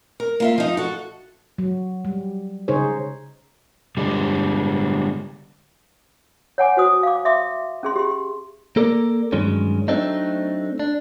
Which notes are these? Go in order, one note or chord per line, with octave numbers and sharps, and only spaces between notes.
A#4
A#3 F4 E5
F3 D#4
F#4 A4
F#3
G3
C#3 D#4 G#4 C5 C#5
D3 G3 G#3
C#5 F#5 G#5 D6
F#4 C5 D#6
F5 D6
E5 C6 D6
C#4 G#4 C6
G4 C6
A#3 A4 A#4 D5
G2 D#3 F#3 G#3 C#4
F#3 A3 C4 D4 D#4
D4